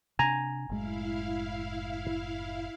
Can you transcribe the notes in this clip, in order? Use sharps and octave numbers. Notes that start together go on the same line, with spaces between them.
C3 D4 G#5 A#5
F#1 A2 G#3 E4 F5